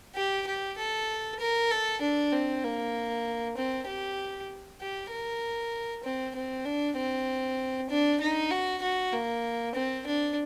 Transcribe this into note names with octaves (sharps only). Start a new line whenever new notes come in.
G4
G4
A4
A#4
A4
D4
C4
A#3
C4
G4
G4
A#4
C4
C4
D4
C4
D4
D#4
F#4
F#4
A#3
C4
D4